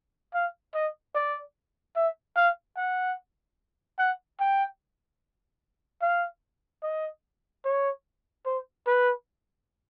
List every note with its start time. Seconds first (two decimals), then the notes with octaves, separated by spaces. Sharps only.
0.34 F5
0.75 D#5
1.15 D5
1.96 E5
2.36 F5
2.77 F#5
3.99 F#5
4.40 G5
6.02 F5
6.83 D#5
7.65 C#5
8.46 C5
8.87 B4